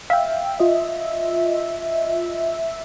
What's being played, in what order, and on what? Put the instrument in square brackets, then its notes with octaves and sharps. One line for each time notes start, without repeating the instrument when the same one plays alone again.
[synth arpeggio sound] E5 [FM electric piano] F5 G5
[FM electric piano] F4 D#5